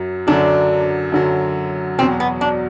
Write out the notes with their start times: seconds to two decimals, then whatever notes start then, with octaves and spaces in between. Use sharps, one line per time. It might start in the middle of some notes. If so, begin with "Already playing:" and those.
Already playing: F#2 F#3
0.27 F#2 D3 F#3 D4
1.12 F#2 D3 F#3
1.98 E2 B2 F#3 C4
2.20 B3
2.41 D4